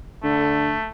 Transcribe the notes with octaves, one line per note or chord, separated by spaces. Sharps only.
D3 A3